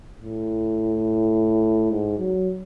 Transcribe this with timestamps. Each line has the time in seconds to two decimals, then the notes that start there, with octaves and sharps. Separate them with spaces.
0.22 A2
1.91 G#2
2.19 F#3